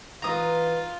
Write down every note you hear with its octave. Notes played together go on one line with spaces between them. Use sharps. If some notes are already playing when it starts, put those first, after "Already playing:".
E3 D#4 F4 B4 A#5 D#6